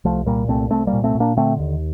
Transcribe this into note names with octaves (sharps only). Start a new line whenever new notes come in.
C2 F3 A3
A#2 G3 A#3
C2 A3 C4
C2 A3 C4
G3 A#3
A#2
A3 C4
A#2
A#3 D4
D3 A3 C4
D#2